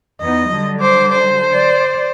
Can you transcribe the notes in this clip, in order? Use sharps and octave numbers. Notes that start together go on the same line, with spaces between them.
E2 B3 D#4 D#5
D3 F#3 G3
C5 D6
C5
D5